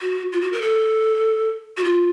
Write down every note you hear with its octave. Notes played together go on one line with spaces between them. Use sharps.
F#4
F4
F#4
A#4
A4
F#4
F4